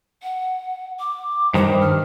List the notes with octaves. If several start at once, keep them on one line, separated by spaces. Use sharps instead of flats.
F#5
D6
G2 D#3 C5
F6